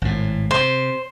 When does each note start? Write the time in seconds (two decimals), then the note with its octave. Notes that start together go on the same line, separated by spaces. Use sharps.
0.02 G#1 A2
0.51 C3 C5